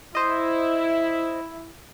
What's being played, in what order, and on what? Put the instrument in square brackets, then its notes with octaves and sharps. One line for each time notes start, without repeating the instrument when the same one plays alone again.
[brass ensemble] E4 [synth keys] C5 D#5